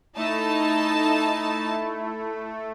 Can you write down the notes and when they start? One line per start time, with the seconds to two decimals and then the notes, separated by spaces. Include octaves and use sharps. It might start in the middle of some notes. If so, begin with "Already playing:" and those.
0.16 A3 D#4 E4 A5